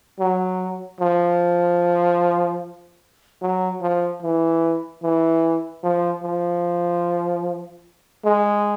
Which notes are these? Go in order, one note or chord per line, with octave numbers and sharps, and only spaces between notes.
F#3
F3
F#3
F3
E3
E3
F3
F3
G#3